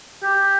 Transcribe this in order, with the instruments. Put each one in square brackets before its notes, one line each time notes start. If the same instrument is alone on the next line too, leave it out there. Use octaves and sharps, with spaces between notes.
[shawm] G4